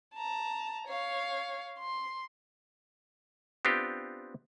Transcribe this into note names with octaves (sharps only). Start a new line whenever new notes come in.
A5 A#5
C#5 F5
C6
B3 C4 D4 F4 G4